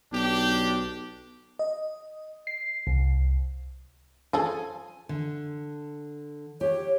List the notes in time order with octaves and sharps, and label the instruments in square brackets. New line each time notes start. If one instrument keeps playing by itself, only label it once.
[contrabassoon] B1 [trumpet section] D4 G4
[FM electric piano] D#5
C7
C2
[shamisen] F3 G#4 A4 [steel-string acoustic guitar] G#5
[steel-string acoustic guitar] D3
[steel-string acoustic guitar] G4 [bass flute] C#5